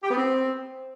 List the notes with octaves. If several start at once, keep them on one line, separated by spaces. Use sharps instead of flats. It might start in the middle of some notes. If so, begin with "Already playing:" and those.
G4
B3
C4